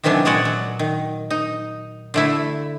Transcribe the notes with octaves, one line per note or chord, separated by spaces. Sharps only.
C3 D#3 E3 F#3 C#4 D4
A#2 G#3 F#4 C#5 D5 F#5
F#3
D#3
D#4
D3 A3 E4